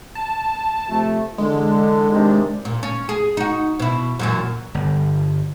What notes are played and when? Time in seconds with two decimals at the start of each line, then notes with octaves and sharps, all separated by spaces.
0.15 A5
0.88 C3 F3 A3
1.38 D3 E3 G#3
2.11 C3 D#3 D4
2.65 A#2
2.83 C#4
3.09 G#4
3.37 D#4 F#4
3.79 B2 E4
4.19 F#2 A#2 E3
4.75 G1